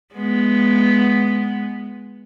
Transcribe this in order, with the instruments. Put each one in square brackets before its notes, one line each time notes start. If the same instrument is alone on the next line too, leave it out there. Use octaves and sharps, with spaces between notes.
[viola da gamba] G#3 B3